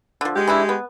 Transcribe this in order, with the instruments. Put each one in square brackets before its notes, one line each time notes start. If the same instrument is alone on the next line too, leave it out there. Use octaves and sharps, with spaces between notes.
[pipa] D3 F3
[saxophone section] G#3 G4
[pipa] E3 D4 E4
B3